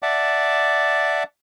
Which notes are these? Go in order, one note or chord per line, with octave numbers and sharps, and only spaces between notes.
D5 E5 F#5 A5 D6